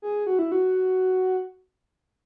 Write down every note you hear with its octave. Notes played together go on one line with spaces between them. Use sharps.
G#4
F#4
E4
F#4